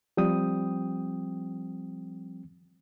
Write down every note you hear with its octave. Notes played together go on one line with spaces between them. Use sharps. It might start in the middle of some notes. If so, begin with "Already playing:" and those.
F3 G3 C4 G5 D#6